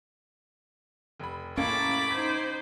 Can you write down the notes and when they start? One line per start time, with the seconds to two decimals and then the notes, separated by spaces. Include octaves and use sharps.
1.19 F1 B5
1.57 C#2 A2 A#3 C#4 A5 B5 D6
2.11 D#4 C5 G#6